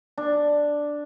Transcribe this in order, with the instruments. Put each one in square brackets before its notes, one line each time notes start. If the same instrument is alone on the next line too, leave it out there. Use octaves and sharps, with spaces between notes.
[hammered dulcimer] D4